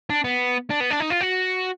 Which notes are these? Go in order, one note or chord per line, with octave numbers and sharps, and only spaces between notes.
D4
B3
D4
B3
D4
D#4
F4
F#4